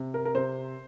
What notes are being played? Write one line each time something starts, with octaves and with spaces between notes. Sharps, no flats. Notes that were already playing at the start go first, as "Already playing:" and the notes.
Already playing: C3
A#4
A#4
C3 C5